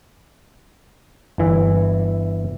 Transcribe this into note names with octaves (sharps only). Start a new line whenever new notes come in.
G1 E3 E5